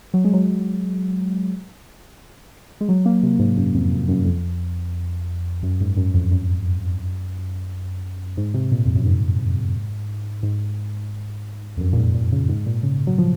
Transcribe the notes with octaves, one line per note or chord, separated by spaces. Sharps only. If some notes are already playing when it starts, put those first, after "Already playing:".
F#3
G#3
F#3
G#3
F#3
A#3
C3
G#2
F#2
F2
F2
F#2
F2
F#2
G#2
F#2
F2
F#2
G#2
C3
A#2
F2
F#2
G#2
G#2
F2
F#2
A#2
G#2
A#2
C#3
G#2
A#2
C#3
F#3
F3